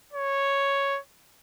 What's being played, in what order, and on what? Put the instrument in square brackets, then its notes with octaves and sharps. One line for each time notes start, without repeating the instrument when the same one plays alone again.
[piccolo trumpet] C#5